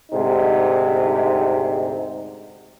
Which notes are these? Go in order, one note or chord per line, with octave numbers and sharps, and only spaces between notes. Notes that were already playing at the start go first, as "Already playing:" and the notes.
D2 G#2 C3 D#4